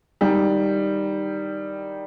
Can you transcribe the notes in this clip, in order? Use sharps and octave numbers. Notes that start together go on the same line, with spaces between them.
D#3 G3